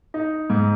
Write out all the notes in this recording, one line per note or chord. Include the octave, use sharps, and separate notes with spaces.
D#4
G#2